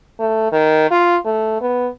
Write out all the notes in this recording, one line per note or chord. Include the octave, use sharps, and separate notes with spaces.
A3
D#3
F4
A3
B3